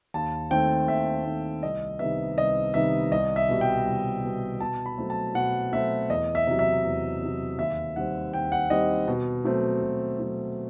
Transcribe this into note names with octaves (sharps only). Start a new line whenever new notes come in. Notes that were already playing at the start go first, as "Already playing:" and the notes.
D#2 A5
D#3 A3 C4 G5
D#2 E5
D#3 A3 C4
C2 D#5
C3 D#3 G3 B3 E5
C2 D#5
C3 D#3 G3 B3 E5
C2 D#5
E5
B2 G3
G5
C2
B2 G3
B2 A5
B5
F#3 A3 C4
A5
B2 F#5
F#3 A3 C4 E5
E2 D#5
E5
C3 F#3
E5
E2
C3 F#3
D#2 E5
D#3 G3 C4 F#5
D#2 G5
F#5
D#3 G3 C4 D#5
B2
F#3 A3 C4
B2
F#3 A3 C4